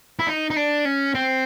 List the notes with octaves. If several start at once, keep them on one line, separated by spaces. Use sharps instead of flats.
E4
D#4
D#4
D4
C#4
C4